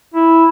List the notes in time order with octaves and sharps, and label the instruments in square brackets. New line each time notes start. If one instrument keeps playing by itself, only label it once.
[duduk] E4